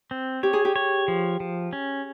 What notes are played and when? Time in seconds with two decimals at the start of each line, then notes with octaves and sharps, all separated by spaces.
0.11 C4
0.43 G4 C#5
0.53 G#4
0.65 G4
0.76 C#5
1.08 F3
1.40 F3
1.73 C#4